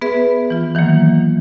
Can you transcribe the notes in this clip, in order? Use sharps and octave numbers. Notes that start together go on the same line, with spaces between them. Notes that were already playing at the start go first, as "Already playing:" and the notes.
B3 G#4 B4 E5
E3 F4
D#3 E3 F#3 A#3